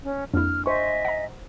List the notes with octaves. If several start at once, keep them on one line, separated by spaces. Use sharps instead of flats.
C#4
F2 A#3 D4 E4 F6
C5 D#5 E5 G#5 C#6
F#5 A#5